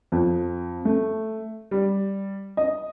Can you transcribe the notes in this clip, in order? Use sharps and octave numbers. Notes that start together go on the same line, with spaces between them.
F2
A3
G3
D#5